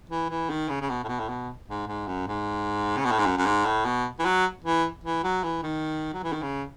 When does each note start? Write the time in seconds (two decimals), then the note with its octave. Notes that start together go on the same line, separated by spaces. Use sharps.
0.10 E3
0.30 E3
0.50 D#3
0.69 C#3
0.81 C#3
0.89 B2
1.04 A2
1.08 B2
1.20 A2
1.29 B2
1.68 G#2
1.88 G#2
2.08 F#2
2.27 G#2
2.97 C#3
3.05 B2
3.12 A2
3.19 G#2
3.26 F#2
3.37 F#2
3.46 G#2
3.65 A2
3.85 B2
4.19 E3
4.25 F#3
4.64 E3
5.04 E3
5.24 F#3
5.44 E3
5.63 D#3
6.14 F#3
6.24 E3
6.33 D#3
6.42 C#3